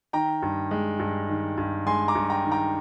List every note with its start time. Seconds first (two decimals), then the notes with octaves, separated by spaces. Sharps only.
0.13 D#3 G5 A#5
0.42 G2
0.71 G#3
0.99 G2
1.29 D#3
1.57 G2
1.87 G#3 G#5 C6
2.08 A#5 D6
2.15 G2
2.30 G5 A#5
2.45 D#3
2.51 G5 A#5